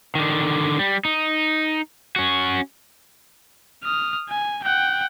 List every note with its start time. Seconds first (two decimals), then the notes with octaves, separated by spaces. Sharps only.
0.15 D3 D#3
0.79 G3
1.05 D#4
2.16 C#4 F#4
3.84 D#6 F6
4.29 G#5
4.64 F#5 G5